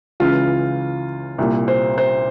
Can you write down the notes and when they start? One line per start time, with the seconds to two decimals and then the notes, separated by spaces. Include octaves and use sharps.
0.20 C#2 C#3 E3 F4
1.38 C2 A#2
1.68 C5
1.98 C5